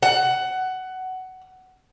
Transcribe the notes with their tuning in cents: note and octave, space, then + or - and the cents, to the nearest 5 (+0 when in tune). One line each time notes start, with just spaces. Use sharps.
F#5 +15